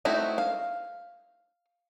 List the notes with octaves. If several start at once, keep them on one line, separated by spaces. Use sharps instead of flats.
A3 C4 D#4 E4 F#4
F5